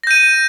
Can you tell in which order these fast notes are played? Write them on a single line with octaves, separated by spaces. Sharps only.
A#6 G6 D#7